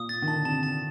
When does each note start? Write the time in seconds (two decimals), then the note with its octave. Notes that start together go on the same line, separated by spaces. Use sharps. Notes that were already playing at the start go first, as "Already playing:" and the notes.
Already playing: A#2 D#6
0.09 A6
0.22 D#3
0.28 A5
0.34 D3
0.45 C3 A5
0.63 A5